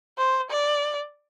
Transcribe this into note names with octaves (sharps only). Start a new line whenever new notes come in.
C5
D5